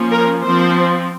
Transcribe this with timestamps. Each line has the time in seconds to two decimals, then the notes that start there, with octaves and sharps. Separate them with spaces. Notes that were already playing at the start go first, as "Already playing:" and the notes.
Already playing: F3 A#3 C#4
0.11 A#4
0.43 F3 C4 C5